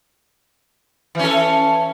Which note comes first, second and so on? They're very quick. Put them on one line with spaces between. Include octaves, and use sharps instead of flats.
E3 C#4 A4